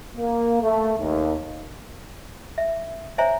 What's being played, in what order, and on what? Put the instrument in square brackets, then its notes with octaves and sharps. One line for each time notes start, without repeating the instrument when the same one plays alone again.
[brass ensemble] A#3
A3
D#2
[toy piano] E5
C5 C#5 E5 G#5 A#5